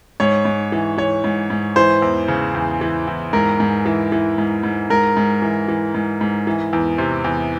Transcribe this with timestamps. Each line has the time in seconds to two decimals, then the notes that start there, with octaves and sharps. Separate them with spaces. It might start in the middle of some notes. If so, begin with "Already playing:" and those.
0.20 G#2 C#5
0.45 G#2
0.72 E3
0.98 E3 C#5
1.24 G#2
1.50 G#2
1.76 E3 C5
2.02 E2
2.28 C#3
2.55 E2
2.81 E3
3.07 E2
3.33 G#2 A#4
3.60 G#2
3.86 E3
4.12 E3
4.38 G#2
4.63 G#2
4.90 G#2 A#4
5.17 G#2
5.42 E3
5.68 E3
5.94 G#2
6.21 G#2
6.47 E3
6.73 E2
6.98 C3
7.24 E2